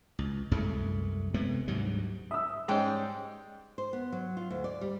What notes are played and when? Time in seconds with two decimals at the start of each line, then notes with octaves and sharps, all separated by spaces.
0.19 C#2
0.52 C2 F#2 G#3 A3
1.34 C3 G#3 A3 B3
1.68 D2 G#2 F#3 G3
2.31 E5 D#6 E6
2.68 G#2 G3 G#3 C#4 G5
3.78 C5
3.93 B3
4.12 F#3
4.37 F4
4.50 D2
4.64 D5
4.81 G3